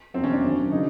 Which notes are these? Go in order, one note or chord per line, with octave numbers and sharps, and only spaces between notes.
E2 B2 F#3 C4
C#4
D4
F#2 D#3 F#3
C#3 F#3 D#4